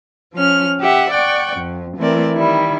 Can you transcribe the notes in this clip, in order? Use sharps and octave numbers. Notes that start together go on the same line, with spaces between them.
F3 C#4 F6
G4 E5 F#5
D5 F#5 G5 C#6
F2
E3 A3 C4 A#4 D5
D#3 G3 E4